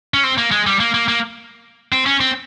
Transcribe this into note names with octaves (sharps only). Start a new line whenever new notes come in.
C#4
C4
A#3
G#3
G3
A#3
A#3
A#3
C4
C#4
C4